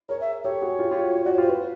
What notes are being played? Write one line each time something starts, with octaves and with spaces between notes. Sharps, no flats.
G#4 A#4 C#5
E5
G4 A4 C#5
F#4 G#4
F4 G4
F4 G4
F#4
F4
F#4 D5
C#5
F4 G4 C5
F4 B4